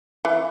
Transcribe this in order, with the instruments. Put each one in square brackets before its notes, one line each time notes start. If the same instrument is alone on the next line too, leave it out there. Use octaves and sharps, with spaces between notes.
[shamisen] E3